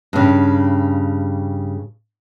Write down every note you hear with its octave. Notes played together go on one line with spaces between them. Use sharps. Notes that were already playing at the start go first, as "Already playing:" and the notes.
G2 C#3